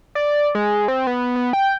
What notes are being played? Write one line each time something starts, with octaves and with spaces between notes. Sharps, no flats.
D5
G#3
C4
B3
B3
G5